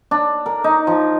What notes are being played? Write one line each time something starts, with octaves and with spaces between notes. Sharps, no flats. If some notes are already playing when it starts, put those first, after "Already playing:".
D4
A#4
D#4
F3